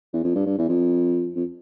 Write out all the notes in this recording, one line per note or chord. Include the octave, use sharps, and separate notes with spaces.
E2
F2
G2
G2
E2
F2
F2